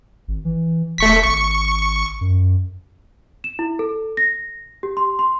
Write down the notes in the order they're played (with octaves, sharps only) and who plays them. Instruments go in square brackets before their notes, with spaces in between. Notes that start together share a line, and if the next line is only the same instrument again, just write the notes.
[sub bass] G#1
E3
[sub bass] D#1 [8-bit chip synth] A3 C#6 B6
[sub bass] G#1 [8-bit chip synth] C#6
[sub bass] F#2
[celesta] E7
E4
A4
A#6
G4
C6
C6